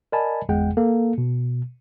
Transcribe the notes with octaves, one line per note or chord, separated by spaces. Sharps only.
A#4 D5 D#5 G#5 A5 B5
G1 E2 G#3 G#4 F#5 G5
A#3 A4
B2